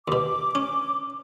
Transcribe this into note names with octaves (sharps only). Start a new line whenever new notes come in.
D#2 B2 D6
C#4